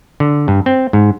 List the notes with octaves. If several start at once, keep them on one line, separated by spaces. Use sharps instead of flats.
D3
G2
C4
G#2